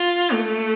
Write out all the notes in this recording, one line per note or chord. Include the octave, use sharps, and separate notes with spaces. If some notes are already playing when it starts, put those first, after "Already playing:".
Already playing: F4
A3